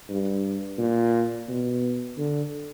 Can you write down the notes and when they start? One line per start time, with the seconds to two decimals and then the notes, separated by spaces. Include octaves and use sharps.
0.09 G2
0.78 A#2
1.48 B2
2.18 D3